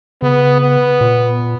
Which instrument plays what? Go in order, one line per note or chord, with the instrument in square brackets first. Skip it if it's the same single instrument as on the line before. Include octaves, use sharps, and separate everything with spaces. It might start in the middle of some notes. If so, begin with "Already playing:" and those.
[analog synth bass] C#3 [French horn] B3
[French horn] B3
[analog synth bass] A#2